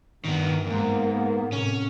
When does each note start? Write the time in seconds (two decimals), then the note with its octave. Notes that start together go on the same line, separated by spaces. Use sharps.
0.25 G2 D#3 B3
0.67 E2 G#2 A#3 B3
1.52 A2 C3 C#4